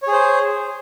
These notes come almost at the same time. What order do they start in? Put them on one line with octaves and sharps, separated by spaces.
C#5 G#4 C5